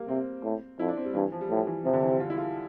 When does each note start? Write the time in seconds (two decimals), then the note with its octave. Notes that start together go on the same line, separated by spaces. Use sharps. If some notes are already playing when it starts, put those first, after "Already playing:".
Already playing: G3 A#3
0.08 C3 C4
0.44 A2
0.79 F2 E4
0.88 D4
0.97 C4
1.05 G3
1.14 G2 E3
1.32 F3
1.41 G3
1.50 A2 F3
1.67 E3
1.85 C3 F3
1.93 D3
2.03 E3
2.11 G3
2.20 F4
2.30 E4
2.38 F4